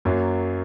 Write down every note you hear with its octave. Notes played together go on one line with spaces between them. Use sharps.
F#2 F#3 A#3